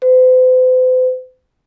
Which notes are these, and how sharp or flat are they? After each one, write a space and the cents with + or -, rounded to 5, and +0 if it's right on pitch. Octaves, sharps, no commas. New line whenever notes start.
C5 -45